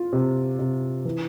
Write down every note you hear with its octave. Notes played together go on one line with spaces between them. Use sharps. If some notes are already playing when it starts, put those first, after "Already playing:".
Already playing: F4
C3
C3
E3